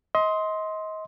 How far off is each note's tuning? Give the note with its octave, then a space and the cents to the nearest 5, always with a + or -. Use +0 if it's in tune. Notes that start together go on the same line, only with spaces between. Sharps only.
D#5 +30 C6 +0